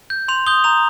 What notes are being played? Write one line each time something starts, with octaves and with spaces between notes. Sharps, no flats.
G6
C6 F7
D#6 G6 G7
A#5 F7